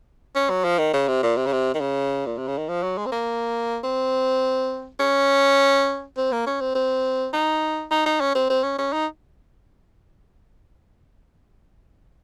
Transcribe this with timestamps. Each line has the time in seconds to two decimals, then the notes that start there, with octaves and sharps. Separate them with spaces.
0.36 C#4
0.50 F#3
0.64 F3
0.79 D#3
0.94 C#3
1.08 C3
1.23 A#2
1.37 C3
1.46 C#3
1.52 C3
1.74 D#3
1.81 C#3
2.26 A#2
2.38 C3
2.47 C#3
2.58 D#3
2.69 F3
2.83 F#3
2.98 G#3
3.06 C4
3.12 A#3
3.84 C4
5.00 C#4
6.17 C4
6.32 A#3
6.47 C#4
6.61 C4
6.75 C4
7.33 D#4
7.91 D#4
8.06 D#4
8.21 C#4
8.35 C4
8.50 C4
8.63 C#4
8.78 C#4
8.93 D#4